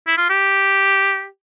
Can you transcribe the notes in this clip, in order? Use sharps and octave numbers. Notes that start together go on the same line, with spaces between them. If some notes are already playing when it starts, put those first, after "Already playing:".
E4
F4
G4